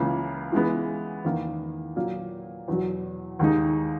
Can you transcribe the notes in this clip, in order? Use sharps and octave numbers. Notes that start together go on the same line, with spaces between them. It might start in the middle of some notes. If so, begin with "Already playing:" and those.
Already playing: C#2 C#3 E3 A#3
E3 G#3 B3
E2 D#3 A#3
A#2 F#3 A#3
E2 B2 F#3
D#2 D#3 G#3 D#4